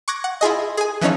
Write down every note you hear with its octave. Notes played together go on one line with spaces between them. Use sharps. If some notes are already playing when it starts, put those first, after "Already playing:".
C#6 D6 F#6 G#6 A#6
F#5
E4 F4 G#4 D#5
G#4 G#5
E3 F3 C#4 D#4 C#5